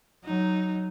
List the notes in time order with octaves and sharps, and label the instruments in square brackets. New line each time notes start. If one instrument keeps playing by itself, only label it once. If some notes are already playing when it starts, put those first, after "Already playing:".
[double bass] F#3 [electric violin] D#4